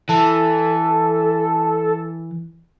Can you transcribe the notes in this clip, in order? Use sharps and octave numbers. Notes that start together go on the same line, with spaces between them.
E3 A4